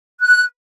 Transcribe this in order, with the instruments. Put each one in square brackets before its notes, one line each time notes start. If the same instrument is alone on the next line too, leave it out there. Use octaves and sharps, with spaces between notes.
[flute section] F#6